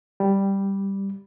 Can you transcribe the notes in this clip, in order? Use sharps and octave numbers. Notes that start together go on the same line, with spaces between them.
G3